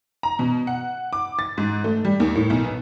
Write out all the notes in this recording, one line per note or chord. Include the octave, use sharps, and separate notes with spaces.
A#5
B2
F#5
D6
A6
G#2
A3
G3
D#2
A2
B1
B3